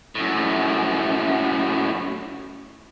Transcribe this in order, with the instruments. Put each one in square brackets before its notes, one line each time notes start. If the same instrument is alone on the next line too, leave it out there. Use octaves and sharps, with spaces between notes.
[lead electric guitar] F#2 A2